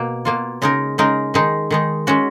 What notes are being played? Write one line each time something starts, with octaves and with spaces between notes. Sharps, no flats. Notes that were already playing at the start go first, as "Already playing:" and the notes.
Already playing: B2 A#3
B2 A#3 F4
C#3 G#3 D#4 A#4
C#3 G#3 D#4 A#4
D#3 G#3 D#4
D#3 G#3 D#4
G#3 C#4 F#4